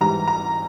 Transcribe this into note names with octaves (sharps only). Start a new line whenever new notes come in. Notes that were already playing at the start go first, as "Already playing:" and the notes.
G#2 E3 G3 A#5
A#5